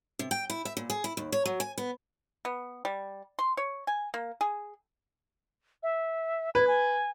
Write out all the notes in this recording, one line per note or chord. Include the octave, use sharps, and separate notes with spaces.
C3
G5
E4
E5
A#2
G#4
E4
D#2
C#5
F#3
G#5
B3
B3
G3
C6
C#5
G#5
A#3
G#4
E5
B4 G#6
G#5